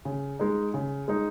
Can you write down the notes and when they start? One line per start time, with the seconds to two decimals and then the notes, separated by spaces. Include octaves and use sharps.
0.05 C#3
0.39 G#3 D#4
0.74 C#3
1.08 G#3 D#4